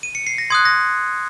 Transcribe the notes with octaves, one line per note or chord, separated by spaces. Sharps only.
D#7
C#7
C7
A#6
C6 D#6 F#6 G#6
A#6